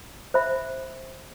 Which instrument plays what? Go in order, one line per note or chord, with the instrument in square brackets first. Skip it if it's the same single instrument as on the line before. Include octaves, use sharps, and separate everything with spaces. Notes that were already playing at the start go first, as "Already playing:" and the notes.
[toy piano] C5 E5 B5